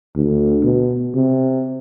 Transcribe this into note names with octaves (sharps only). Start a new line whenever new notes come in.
D2
B2
C3